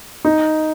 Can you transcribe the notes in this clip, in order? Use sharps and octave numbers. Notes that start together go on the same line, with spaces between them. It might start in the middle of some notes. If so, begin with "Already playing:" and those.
D#4